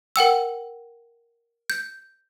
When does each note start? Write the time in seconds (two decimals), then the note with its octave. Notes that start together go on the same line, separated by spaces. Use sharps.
0.16 A#4 F#5 G5 E6
1.70 G6